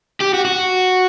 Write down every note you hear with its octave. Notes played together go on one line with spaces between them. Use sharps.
G4
F#4
F#4